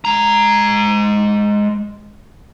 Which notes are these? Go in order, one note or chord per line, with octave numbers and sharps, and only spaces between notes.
G#3 A#5